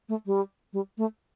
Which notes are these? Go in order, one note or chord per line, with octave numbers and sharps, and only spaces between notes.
A3
G3
G3
A3